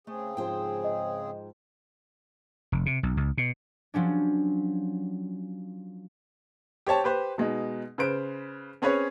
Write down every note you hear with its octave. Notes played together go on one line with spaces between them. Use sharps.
C#3 A3 C4 G#4
G#2 F3 G#3 C5 G5
D#5
F1
C3
B1
C#2
B2
F3 F#3 C#4 D4
G4 C5 C#5 A5
G4 B4 C5
B2 G#3 D#4
C#3 B4 C5 D7
C4 C#4 G#4 B4 C#5